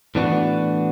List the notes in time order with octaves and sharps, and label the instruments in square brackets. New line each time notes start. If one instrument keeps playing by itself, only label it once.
[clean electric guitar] A2 E3 B3 D4 F#4